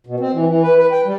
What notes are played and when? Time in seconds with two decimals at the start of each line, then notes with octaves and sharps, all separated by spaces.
0.07 B2
0.20 C4
0.33 E3
0.47 E3
0.63 B4
0.78 B4
0.92 G5
1.05 G3